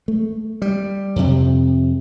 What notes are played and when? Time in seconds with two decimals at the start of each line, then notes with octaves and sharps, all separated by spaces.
0.08 A3
0.62 G3
1.16 F2 C3